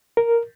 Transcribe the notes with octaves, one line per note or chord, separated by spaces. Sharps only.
A#4